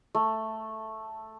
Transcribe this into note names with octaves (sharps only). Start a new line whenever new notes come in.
A3